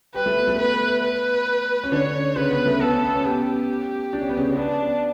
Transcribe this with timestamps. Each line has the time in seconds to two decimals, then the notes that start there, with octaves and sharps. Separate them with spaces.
0.15 G3 G4 B4
0.26 A3
0.37 B3
0.47 A3
0.59 B3 B4
1.03 B4
1.84 C#4
1.92 D3 D4 C#5
2.36 C#3 C#4 B4
2.51 B3
2.66 A3
2.80 B3 A4
2.92 C#4
3.05 B3
3.16 C#4
3.24 B3 G4
4.13 D4
4.21 C#4
4.29 B3
4.37 C#3 C#4
4.49 C#4
4.57 B3 D4